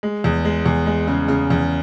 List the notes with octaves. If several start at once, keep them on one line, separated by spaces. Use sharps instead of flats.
G#3
E2
G#3
E2
G#3
C#3
C#3
E2